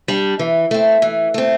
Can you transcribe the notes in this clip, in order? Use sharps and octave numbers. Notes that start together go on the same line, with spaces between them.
G3 D4
E3
A3 C4
E3
A3 C4